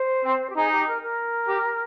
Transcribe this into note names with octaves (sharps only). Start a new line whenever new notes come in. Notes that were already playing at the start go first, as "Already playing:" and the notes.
Already playing: C5
C4
G4
D#4 G#4
G4
A#4
A#4
G4